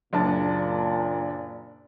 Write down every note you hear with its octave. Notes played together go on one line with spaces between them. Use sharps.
F#1 A#2 D4 A5